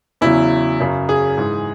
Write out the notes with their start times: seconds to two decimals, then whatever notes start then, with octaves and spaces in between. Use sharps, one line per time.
0.21 E2 C#3 F#3 E4
0.80 F#2 C#3 F#3
1.09 G#4
1.37 G#2 E3